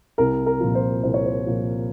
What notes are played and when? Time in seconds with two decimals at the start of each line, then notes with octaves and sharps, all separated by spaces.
0.18 C2 A#4
0.46 A#4
0.60 A#2 F3
0.75 C5
1.03 C2 C5
1.14 C#5
1.26 C5
1.46 A#2 F3